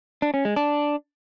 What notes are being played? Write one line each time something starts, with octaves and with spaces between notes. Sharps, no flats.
D4
C#4
G#3
D4